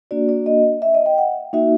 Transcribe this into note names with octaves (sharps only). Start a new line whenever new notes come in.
A#3 D4 F#4 D5
D5
D#5
E5
D#5
G5
F#5
A#3 D#4 F#4 E5